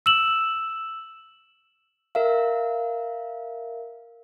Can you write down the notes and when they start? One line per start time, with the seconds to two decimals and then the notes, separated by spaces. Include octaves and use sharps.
0.06 E6 E7 F#7
2.15 A#4 E5 F5